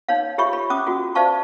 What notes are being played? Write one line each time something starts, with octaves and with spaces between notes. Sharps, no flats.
D#4 C#5 F5
F4 G4 C#5 E5 B5 C#6
B5
C#4 D6 D#6
F4 F#4
C5 D5 E5 F5 A5 C#6